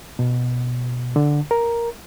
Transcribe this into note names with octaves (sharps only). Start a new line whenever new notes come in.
B2
D3
A#4